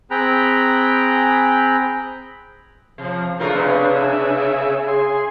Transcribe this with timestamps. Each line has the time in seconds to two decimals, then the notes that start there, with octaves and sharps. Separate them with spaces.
0.11 C4 G#4 G5 A#5 B5 F#6
2.98 C3 F3
3.40 C#3 A3 D4 F4 A#4
3.53 C3 B3 C#4
3.96 G#4 E5
4.88 G#4 G#5 C6